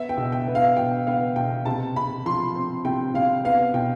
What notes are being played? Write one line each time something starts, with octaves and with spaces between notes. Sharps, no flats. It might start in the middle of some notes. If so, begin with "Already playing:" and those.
Already playing: B3 E5
G5
B2
G5
B3
F5
B2 G5
B3 F5
B2 G5
C3 A5
C3 B5
F3 C6
C4
C3 G5
C3 F5
B3 F5
B2 G5